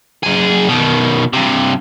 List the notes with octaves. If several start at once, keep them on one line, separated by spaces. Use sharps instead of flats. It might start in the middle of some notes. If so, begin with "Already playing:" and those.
F#2 G#4
B2 D#3
G2 C3